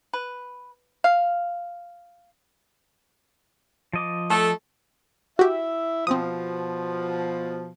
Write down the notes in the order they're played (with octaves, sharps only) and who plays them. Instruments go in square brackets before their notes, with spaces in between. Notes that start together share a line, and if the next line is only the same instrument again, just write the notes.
[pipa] B4
F5
[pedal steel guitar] F3 D#5 D6
[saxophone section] A3 A4
[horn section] E4 E5 [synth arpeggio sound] F#4 G4
[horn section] B2 F3 [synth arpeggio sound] C4 D#6